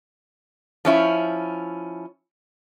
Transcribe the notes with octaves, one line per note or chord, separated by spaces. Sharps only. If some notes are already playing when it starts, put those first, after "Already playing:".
F3 C#4 E4